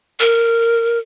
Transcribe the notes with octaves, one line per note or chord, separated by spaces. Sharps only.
A#4